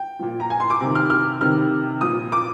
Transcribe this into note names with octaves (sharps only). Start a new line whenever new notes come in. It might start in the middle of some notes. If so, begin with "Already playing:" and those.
Already playing: G5
A#2 F3
A#5
G#5
C6
D6
C3 D#3
F6
F6
C3 D#3 F6
A#2 F3 D#6
D6